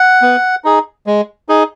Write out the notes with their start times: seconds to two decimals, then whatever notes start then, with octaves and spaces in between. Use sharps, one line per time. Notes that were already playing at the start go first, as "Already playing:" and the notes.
Already playing: F#5
0.22 B3
0.64 D#4 G#4
1.07 G#3
1.49 D#4 G#4